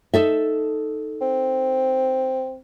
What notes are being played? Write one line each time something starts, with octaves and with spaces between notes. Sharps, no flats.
D#4 A4 E5
C4